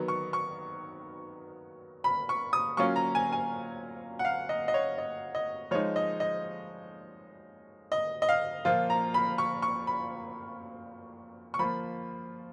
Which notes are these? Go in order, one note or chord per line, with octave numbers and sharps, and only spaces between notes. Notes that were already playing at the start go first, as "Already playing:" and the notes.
Already playing: D#3 F#3 B3
C#6
C#6
B5
C#6
D#6
F#3 A#3 C#4 F4 C#6
A#5
G#5
G#5
F#5
F5
D#5
D#5
C#5
D#5
D#5
F3 G#3 D#4 C#5
D#5
D#5
D#5
D#5
F5
A#2 F3 A#3 F4
A#5
B5
C#6
C#6
B5
C#6
F3 A#3 F4 B5